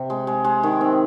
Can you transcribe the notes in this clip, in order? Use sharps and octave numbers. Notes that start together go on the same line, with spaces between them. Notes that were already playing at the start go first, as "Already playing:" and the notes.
Already playing: C3
G#3
G#3
G#3
D#3
C4